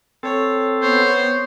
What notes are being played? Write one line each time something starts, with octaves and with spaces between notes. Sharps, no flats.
C4 A4 C#5
B3 C5 C#5